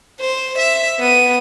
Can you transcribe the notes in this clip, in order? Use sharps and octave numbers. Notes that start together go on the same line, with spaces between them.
C5
E5
B3 D#7